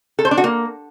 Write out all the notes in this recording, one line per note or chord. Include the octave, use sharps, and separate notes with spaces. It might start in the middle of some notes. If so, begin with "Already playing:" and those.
A4
C5
D4
F#4
A#3